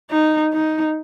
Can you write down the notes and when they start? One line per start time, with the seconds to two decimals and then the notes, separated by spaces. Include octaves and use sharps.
0.11 D#4
0.53 D#4